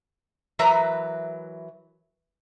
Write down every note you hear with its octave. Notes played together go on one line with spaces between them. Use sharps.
E3 F#3 A#4 B4 E5 A#5